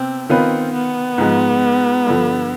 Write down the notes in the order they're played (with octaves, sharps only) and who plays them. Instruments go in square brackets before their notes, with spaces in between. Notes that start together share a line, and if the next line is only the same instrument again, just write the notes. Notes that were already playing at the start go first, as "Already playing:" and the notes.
Already playing: [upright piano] C3 B3 [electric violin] C4
[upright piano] D#3 B3 F4 B4 [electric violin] C4
[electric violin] B3
[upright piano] G#2 F3 G#3
G2 D3 F3